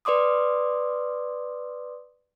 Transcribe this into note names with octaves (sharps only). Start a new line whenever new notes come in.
B4 D5 C6 D6 D#6